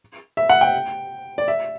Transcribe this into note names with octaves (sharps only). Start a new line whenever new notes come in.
E5
F#5
G5
D5
E5